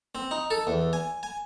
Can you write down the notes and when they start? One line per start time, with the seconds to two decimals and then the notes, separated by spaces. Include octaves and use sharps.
0.15 C4
0.31 D#4
0.51 A4
0.67 E2
0.93 G#5
1.23 G#5